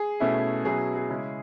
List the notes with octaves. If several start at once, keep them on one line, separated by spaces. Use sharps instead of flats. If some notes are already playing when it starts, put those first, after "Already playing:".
Already playing: G#4
B2 A3 C#4 E4
B2 F#3 C#4 E4 G#4
G#4
C#3 G#3 C#4 E4